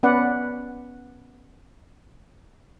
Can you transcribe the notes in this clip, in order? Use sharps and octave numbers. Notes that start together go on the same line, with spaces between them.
B3 C#4 B4 D5 F#5